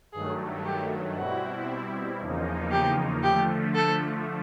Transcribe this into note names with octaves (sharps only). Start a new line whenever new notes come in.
G2 D#3 F#3 A3 G#4
G4
B2 G3 C4 E4 F#4
E2 C#3 F3 A#3 D#4
G4
D3 F3 A3 G4
A4